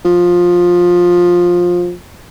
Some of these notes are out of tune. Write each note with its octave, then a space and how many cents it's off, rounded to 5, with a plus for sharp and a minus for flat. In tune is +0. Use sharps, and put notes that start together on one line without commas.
F3 +15